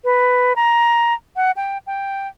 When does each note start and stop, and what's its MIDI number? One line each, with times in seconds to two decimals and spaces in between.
0.04 0.53 71
0.56 1.14 82
1.36 1.51 78
1.56 1.78 79
1.87 2.28 79